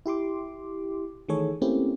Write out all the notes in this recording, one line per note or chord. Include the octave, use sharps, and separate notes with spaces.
E4 G4 C6 D6
D#3 E3 A3 G#4 A4 C#5
A3 A#3 C4 C#4 E4 G4